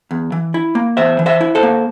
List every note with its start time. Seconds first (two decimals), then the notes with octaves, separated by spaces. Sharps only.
0.11 E2
0.32 E3
0.54 E4
0.75 A#3
0.97 E2 C5 E5
1.19 E3
1.26 C5 E5
1.41 E4
1.55 A4 C5
1.63 A#3